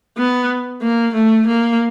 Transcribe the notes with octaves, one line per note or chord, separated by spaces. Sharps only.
B3
A#3
A3
A#3